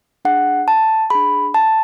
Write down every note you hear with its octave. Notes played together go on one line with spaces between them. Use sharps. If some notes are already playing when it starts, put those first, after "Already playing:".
D4 G#4 F#5
A5
D4 G#4 B5
A5